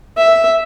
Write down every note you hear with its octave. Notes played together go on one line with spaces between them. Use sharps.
E5